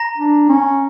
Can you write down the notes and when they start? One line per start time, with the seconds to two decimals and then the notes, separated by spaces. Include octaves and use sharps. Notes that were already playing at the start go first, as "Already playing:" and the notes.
Already playing: A#5 A#6
0.17 D4
0.49 C#4